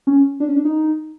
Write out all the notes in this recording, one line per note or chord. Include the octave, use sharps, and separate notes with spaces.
C#4
D4
C#4
D4
D#4